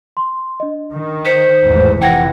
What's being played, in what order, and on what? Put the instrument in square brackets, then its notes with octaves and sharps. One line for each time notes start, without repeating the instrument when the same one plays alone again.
[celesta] C6
D4 D#5
[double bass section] D#3
[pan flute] C5 [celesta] B6 C#7
[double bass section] A1 E2 G#2
[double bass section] F1 C3 E3 [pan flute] F#5 [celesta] G5 G#6 A#6